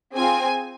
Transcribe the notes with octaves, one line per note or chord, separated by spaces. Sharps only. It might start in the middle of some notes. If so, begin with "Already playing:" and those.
C4 F4 G#4 G#5